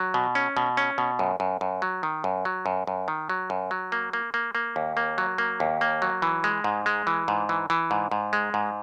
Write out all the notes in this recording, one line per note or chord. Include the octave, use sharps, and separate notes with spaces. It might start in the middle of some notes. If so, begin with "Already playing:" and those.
Already playing: F#3
B2
C#4
B2
C#4
B2
F#2
F#2
F#2
F#3
D#3
F#2
F#3
F#2
F#2
D#3
F#3
F#2
F#3
A#3
A#3
A#3
A#3
D#2
A#3
F#3
A#3
D#2
A#3
F#3
E3
G#3
G#2
G#3
E3
G#2
E3
E3
G#2
G#2
G#3
G#2